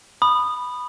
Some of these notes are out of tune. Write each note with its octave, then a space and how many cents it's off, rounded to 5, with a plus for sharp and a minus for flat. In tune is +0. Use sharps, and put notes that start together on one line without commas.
B5 +0 D#6 -20